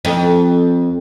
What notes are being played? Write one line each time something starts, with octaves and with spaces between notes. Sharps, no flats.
F2